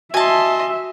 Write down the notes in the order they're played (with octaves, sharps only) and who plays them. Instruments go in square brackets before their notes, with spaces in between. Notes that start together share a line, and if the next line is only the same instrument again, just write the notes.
[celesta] F#4 [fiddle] D#5 C6 [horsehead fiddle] E5 [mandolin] G#5 A5